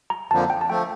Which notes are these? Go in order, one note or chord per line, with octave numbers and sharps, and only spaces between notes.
A#5
F2 D3 F3 A#3 A5
G5
A5
F3 A3 G5